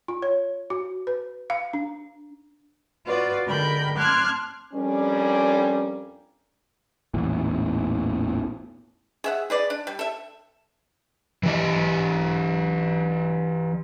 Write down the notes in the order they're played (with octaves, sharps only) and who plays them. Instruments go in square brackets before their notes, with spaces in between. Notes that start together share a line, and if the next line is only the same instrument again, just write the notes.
[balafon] F4
C#5
F#4
B4
F5
D4
[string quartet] F4 F#4 B4 D5
D3 G#3 A#4 G5 B5 G6
A5 C6 D6 F6 F#6 G#6
[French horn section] F2 G3 C#4 D4 A#4 D5
[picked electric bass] A1 E2 A#2
[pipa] G#4 E5 F#5
G#4 B4 D5
D4
G3
A4 E5
[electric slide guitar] E3 G4 D#5